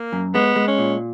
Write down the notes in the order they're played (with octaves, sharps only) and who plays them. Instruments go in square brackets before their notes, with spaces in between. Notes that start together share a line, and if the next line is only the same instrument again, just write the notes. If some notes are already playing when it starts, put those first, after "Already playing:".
Already playing: [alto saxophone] A#3
[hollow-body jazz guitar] F#2
[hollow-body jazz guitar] G#3 [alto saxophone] B3
[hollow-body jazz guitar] G#3
[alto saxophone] C#4
[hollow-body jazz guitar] A#2